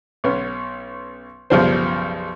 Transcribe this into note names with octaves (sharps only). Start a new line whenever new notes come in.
B1 B3 C#4
B1 F#2 C#3 F3 G3 C5